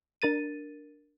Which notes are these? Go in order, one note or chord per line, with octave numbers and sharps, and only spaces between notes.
D4 A#4 A6 D#7